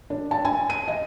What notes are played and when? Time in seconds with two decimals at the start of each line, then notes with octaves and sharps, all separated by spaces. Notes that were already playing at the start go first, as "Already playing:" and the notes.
0.10 D4
0.31 A5
0.45 G#5
0.70 D#7
0.88 D#5